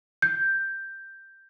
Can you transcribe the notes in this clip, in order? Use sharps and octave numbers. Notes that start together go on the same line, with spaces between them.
G6